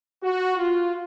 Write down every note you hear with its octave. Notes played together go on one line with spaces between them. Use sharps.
F#4
F4